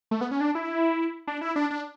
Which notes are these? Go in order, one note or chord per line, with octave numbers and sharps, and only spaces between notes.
A3
B3
C#4
D4
E4
D4
E4
D4
D4